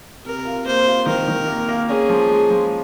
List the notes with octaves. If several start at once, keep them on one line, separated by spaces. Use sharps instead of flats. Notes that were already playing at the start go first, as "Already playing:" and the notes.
C3 A#4
F4
A#3 C5
F4
D#3 A#4
D#3
A#3
A#3
C#4 G#4
F3
G#3
F3